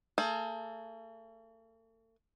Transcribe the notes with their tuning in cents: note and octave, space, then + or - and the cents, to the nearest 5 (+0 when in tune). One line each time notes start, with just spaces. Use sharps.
A3 +45 G#4 +35